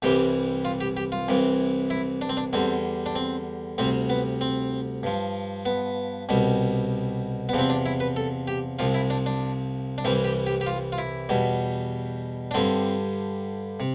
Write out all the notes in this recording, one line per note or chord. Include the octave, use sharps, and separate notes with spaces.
C2 C3 E3 G3 G4
F4
G4
G4
F4
C2 C3 E3
E4
D4
C4
D4
E2 D3 G3 C4
D4
C4
D2 C3 G3 C4
B3
C4
G2 F3
B3
C2 B2 G3
E2 C3 F3 B3
C4
D4
E4
B4
A4
G4
C2 C3 F3 F4
E4
D4
D4
D4
C2 C3 E3 G3 C4
G4
G4
G4
F4
F4
E4
E2 B2 G3
D4
G2 D3 G3 C4
C3